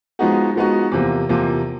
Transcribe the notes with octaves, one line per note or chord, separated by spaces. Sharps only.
F3 G#3 B3 D#4 F#4
F3 G#3 B3 D#4 F#4
E2 C3 F3 A#3
E2 C3 F3 A#3